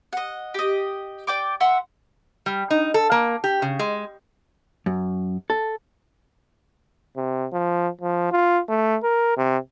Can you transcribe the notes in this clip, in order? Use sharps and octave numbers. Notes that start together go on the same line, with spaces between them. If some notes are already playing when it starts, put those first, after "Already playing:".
D#5 F#5
G4 D#5
D5 G5 D6
E5 F#5 C6
G3
D#4
A4
A#3
G4
C#3
G#3
F#2
A4
C3
F3
F3
F4
A3
A#4
C3